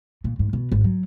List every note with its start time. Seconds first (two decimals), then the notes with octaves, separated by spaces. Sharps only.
0.24 A#2
0.39 G#2
0.53 B2
0.72 G#1
0.84 F#3